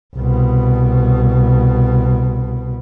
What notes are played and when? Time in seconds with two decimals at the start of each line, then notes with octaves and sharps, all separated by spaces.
0.16 C2 B2